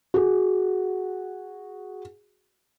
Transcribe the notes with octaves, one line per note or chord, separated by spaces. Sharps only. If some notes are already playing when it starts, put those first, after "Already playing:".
F#4 G#4